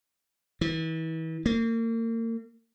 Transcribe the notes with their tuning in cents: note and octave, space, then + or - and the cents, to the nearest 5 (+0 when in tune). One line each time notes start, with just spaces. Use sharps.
E3 -35
A#3 -35